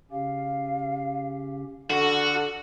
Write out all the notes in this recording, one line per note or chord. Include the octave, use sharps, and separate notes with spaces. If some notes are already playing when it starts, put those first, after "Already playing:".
C#3 C#4 G4 F5
D3 F#4 A4 F6